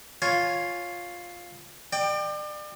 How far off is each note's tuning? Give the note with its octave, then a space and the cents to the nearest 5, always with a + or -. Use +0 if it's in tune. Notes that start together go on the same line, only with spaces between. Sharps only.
F4 +5 C#5 +0 G#5 +20
D5 +35 G5 +10